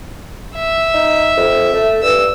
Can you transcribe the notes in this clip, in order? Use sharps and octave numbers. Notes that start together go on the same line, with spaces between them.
E5
D#4
F2
A3
G2 E6